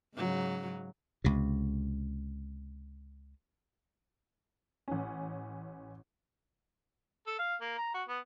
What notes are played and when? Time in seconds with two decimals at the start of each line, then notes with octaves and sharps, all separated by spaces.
0.15 G#2 C#3 F#3
1.24 C#2 C3
4.88 A1 C#4
7.27 A4
7.39 F5
7.61 A#3
7.78 A#5
7.94 F#4
8.09 B3